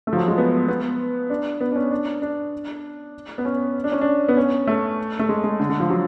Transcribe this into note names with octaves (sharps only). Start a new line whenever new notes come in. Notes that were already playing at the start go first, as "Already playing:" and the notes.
A3
F3
F#3
G#3
B3
B3
D4
B3
D4
C#4
D4
D4
B3
C#4
D4
C#4
D4
B3
C#4
A3
A3
G#3
G#3
D3
D3
F3
F#3